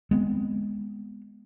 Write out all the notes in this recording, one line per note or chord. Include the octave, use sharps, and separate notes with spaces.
G#3 B3 C4